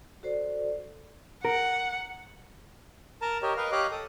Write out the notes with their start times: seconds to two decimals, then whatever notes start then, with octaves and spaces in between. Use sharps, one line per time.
0.23 F#4 A4 C5 D5
1.45 A#4 F#5
3.22 A#4 A5 A#5
3.43 G4 A#4 C#5 D#5
3.57 A#4 B4 D#5 F5
3.72 G4 C#5 D#5 F5 D6 F#6
3.91 A4 D#6